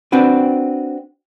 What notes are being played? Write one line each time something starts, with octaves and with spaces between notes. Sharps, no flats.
C4 D4 F#4 B4